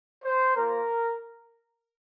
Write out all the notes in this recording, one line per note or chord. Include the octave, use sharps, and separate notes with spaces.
C5
A#3 F4 A#4